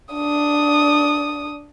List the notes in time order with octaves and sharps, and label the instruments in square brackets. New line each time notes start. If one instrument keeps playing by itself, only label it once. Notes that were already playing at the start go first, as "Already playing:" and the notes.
[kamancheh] D4 D#6